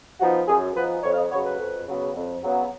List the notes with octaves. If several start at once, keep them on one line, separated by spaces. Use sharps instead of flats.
F3 B3 D#4 F#4
F#2 G#4
F3 B3 D#4 B4
F2 C#5
F5
D#5
C#3 F#3 B3 C#5
B4
F2
C#3 F#3 B3
F2
C#3 F#3 B3